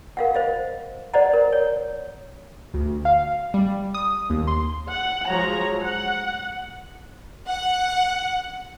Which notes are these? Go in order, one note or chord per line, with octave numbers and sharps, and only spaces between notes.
A#4 F5 F#5
C5 D#5 F5
C5 D5 D#5 F#5 A#5
A#4
C#5
D2
F5
G3
D#6
D#2
C6
F#5
F3 F#3 G#3 C#5 A#5
F#5
F#5